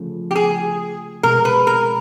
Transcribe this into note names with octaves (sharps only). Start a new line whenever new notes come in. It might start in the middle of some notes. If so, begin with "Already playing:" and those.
Already playing: C#3 F3 A3
G4
G#4
B2 G#3 C4 A#4
B4
A#4